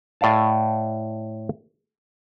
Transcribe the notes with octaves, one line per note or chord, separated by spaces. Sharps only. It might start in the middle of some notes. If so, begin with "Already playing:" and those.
A2 D5 F5 A5